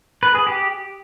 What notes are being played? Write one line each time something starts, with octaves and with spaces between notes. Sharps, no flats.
B4
G#4
G4